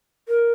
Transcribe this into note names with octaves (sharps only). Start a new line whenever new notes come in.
A#4